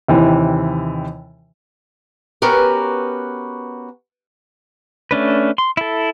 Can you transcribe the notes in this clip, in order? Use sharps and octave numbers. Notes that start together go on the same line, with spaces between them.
D#2 C3 E3
B3 C#4 F#4 G4 A#4 B4
A3 C#4 D4 B4
C6
E4 A4